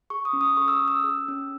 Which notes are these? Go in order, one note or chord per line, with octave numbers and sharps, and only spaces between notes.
G#4 C#6
D#6
C#4
D#6
A4 C#6
E6
D#6
C#4
E6
G#4
C#4